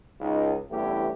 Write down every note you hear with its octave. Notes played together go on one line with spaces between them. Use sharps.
C#2 D#4
A1 E2 G2 A3 E4 G4